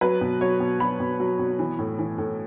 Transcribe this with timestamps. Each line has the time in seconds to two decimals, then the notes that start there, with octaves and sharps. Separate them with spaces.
0.01 F#3 B4
0.21 B2
0.41 F#3 C#5
0.60 B2
0.80 F#3 B5
1.00 B2
1.20 F#3
1.39 B2
1.59 E3
1.78 A2
1.99 E3
2.18 A2